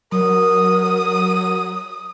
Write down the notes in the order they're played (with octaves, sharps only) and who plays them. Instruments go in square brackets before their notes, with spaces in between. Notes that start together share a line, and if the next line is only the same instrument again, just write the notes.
[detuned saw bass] F#3 [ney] A#4 [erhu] D#6